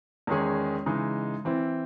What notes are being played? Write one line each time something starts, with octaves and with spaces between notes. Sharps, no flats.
E2 D#3 G#3 C#4 G#4
C#3 E3 G#3 D#4
E3 C4 E4